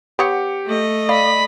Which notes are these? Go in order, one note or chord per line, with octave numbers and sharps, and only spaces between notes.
B3 G4 C#5 F#5 C#7
A3 D#5
D5 F5 B5